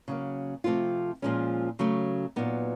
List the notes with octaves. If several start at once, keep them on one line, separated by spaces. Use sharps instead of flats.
C#3 F#3 A#3
C3 F3 A3 C4 F4
A#2 F3 G#3 C#4
C#3 F#3 A3
A#2 F#3 B3 D#4